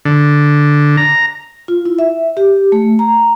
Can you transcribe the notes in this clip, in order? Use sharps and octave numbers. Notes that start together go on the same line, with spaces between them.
D3
A#5
F4
E4
E5
G4
A3
A#5